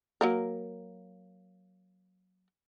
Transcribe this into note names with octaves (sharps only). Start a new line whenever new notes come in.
F#3 A#3 A#4